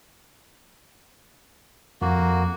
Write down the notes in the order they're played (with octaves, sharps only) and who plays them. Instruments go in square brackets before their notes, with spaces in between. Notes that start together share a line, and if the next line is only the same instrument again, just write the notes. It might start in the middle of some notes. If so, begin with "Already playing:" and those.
[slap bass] F2 F3 [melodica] A#3 F#4